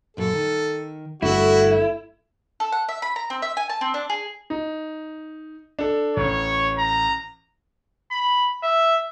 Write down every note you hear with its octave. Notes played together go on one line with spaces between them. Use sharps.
F#2 A#2 A4
D#3
G1 G2 A3 E4 F#4
A4
F#5
E5
B5
A#5
C4
E5
G#5
A5
C4
D4
G#4
D#4
D4 A4
A1 C#5
A#5
B5
E5